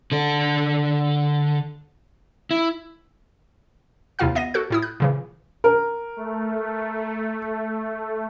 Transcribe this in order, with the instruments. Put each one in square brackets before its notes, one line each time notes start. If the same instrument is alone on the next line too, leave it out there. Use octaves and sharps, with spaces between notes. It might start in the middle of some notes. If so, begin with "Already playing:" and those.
[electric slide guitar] D3 A4
E4
[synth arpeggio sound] D#2 C3 E4 F4 F5 F6
B3 D#5 A#6 D#7
F#4 A4 F#6
A2 E4 D#6
F#6
A#2 C#3 E3
[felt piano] A#4
[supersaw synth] A3